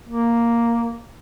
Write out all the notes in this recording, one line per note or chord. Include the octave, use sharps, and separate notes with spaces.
A#3